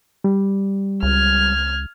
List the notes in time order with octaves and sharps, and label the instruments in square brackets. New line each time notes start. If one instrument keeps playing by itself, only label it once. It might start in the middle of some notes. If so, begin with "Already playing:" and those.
[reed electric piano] G3
[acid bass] C#2 [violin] F6 G#6